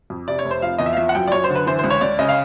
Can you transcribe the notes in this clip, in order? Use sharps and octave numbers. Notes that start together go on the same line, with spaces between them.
F2
C3 D5
C#5
F1
C5
F3 F5
E2 D#5
E5
F5
F3 E5
F#5
F#2 G5
D5
F#2 C#5
C5
D3
B4
E3 C5
C#2 C5
C#5
C#2 D5
C#3 D#5
F5